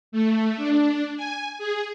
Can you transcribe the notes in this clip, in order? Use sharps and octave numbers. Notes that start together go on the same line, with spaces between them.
A3
D4
G#5
G#4